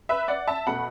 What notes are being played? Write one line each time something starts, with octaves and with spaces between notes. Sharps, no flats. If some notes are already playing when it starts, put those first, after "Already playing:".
B4 E5
D5 F#5
E5 A5
B2 A3 F#5 B5